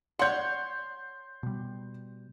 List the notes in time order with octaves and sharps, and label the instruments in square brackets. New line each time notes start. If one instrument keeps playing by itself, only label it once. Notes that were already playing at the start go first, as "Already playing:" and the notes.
[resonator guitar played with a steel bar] C#5 F#5 [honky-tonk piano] C6 G6
[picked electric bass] B2 G3